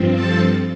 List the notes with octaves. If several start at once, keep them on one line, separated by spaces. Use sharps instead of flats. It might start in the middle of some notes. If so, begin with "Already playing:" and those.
Already playing: G2 F3 C4
A4 A5